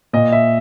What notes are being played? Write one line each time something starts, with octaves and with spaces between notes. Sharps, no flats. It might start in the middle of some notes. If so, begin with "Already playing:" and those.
A#2 D#5
E5